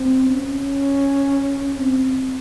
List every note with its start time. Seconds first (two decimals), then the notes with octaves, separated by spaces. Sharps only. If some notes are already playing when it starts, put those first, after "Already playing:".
Already playing: C4
0.29 C#4
1.77 C4